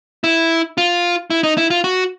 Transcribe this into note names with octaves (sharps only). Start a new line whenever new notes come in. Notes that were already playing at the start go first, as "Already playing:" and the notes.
E4
F4
E4
D#4
E4
F4
F#4